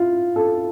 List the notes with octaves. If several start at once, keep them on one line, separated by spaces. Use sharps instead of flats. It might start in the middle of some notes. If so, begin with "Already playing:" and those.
Already playing: E4 F4
A4